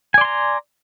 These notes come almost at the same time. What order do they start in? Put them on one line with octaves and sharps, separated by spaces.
G#5 D5 C6 A#5